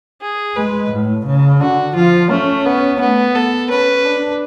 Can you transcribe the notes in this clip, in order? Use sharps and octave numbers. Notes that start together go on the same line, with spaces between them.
G#4
G#3 B4
A2
C#3
D3 F#4
F3 F4
A3 C#4
B3
A3 B3
B3 A4
C#4 B4
D4